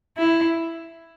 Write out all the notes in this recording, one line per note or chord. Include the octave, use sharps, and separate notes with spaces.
E4